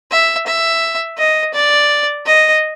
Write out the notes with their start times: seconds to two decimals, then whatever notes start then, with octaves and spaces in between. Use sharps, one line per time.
0.11 E5
0.46 E5
1.18 D#5
1.54 D5
2.26 D#5